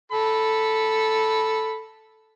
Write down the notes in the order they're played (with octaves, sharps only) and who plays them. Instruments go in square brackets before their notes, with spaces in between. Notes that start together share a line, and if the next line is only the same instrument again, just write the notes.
[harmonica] A4 B5